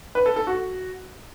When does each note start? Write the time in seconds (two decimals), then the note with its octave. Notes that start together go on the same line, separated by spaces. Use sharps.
0.15 B4
0.26 A4
0.36 A4
0.47 F#4